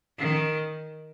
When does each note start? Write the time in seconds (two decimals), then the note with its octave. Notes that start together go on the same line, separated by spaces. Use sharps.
0.18 D#3